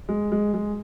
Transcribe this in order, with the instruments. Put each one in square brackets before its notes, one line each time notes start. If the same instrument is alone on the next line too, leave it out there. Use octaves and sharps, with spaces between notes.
[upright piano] G#3
G#3
G#3